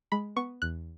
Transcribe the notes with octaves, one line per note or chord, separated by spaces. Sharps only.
G#3 B5
B3 C#6
E2 F#6